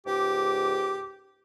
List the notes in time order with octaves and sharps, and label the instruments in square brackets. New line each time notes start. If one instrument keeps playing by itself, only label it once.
[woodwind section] C#2 G#2 D6 [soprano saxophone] G4